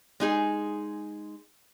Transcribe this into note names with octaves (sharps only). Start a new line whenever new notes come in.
G#3 D#4 G#4